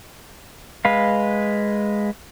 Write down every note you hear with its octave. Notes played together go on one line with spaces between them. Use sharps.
G#3 B4 F5